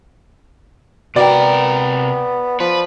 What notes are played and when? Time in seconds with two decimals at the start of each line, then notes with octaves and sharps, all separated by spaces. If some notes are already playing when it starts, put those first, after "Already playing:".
1.16 C3 B3 F#4 A#4 D5 G5
2.60 F3 B4